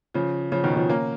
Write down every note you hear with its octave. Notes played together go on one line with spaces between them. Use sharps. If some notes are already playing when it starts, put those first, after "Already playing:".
C#3 F3
C#3 F3
B2 D#3
C#3 F3
A#3 C#4